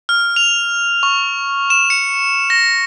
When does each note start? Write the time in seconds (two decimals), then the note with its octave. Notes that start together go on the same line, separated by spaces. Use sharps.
0.09 F6
0.36 F7
1.03 C#6
1.70 E7
1.90 C#7
2.50 A#6